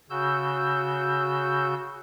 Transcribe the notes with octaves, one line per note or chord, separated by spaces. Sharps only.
C#3 F#4 E6 G6